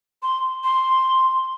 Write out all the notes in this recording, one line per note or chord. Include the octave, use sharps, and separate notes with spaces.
C6
C6